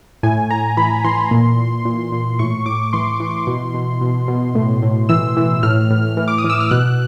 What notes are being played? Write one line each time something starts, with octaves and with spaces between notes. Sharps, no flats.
A2 G#5
A2 A#5
E3 B5
E3 C6
A#2
A#2
A#2
A#2
A2 C#6
A2 D6
E3 C6
E3
B2
B2
B2
B2
A2
A2
E3 E6
E3
A2 F6
A2
E3
D6
D#6
E3
E6
F6
B2 F#6